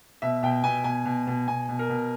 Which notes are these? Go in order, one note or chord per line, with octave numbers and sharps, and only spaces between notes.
B2 E5
B2 G5
B2 G#5
B2 G#5
B2
B2
B2 G#5
B2
A#4
B2